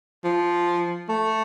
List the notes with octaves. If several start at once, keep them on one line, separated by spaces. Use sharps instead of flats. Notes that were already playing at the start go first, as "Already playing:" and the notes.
F3
A3